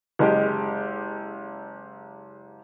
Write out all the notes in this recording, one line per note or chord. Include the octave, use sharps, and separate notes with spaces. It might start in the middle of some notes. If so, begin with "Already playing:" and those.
F#1 G#3 G4